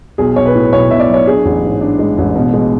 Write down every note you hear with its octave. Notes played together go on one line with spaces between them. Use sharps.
B1 G#4
B1 C#5
B4
A2
B1 C#5
B1 E5
D5
F#3
C#5
D4 G#4
A1
G#2
D4
G#3
A1
B2
G#3